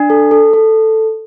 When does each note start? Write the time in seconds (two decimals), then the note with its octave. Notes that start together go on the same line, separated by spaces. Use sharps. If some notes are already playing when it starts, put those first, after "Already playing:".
Already playing: D4
0.10 A4
0.31 A4
0.54 A4